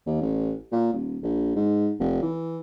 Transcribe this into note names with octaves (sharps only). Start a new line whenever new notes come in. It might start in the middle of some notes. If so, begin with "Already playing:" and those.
D#2
A1
A#2
D#1
A#1
G#2
F1
E3